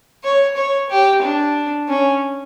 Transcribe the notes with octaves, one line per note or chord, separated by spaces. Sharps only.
C#5
C#5
G4
D4
C#4